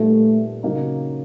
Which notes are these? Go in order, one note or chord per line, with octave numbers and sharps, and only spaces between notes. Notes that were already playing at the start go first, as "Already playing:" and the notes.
Already playing: A#2 G3 A3 B3 D#4
C#3 F#3 A#3 D#4